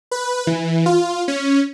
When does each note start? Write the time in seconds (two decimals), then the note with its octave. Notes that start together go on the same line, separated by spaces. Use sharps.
0.11 B4
0.47 E3
0.86 F4
1.28 C#4